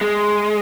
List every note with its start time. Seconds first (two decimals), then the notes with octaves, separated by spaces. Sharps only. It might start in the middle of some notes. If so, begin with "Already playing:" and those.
0.01 G#3